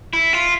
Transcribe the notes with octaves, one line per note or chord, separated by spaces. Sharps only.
E4
F4